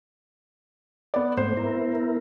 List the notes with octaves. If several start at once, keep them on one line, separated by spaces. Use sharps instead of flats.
B3 D5
G#2 A3 C4 C5
B3 E4 A#4